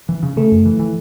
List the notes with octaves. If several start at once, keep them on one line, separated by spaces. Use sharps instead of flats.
E3
C#3
C#3 A3
F#2
E3
E3